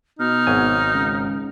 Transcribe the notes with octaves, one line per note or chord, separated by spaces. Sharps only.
B2 D#4 F6
G#1 F#3 G#5
C#2